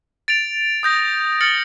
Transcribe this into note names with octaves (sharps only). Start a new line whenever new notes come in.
A6 D7 F7
D#6 G6 A#6
F6 A6 C#7 F#7